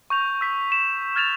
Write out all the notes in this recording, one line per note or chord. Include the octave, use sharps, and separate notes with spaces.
C#6 G6 F7
E6 B6
E7
F6 G#6 A6 E7 F7